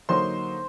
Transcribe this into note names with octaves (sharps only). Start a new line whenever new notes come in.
D3 F#3 A#3 D#4 C5 C6